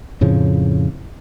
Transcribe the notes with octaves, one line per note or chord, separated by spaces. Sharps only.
F2 A2 C#3 F3